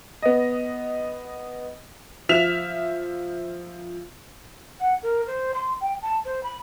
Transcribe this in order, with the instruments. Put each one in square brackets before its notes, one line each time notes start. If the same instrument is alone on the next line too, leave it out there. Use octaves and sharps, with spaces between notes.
[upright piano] B3 D#5
[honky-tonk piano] F3 E5 F6 B6 E7 F7
[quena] F#5
A#4
C5
C6
G5
A5
C5
B5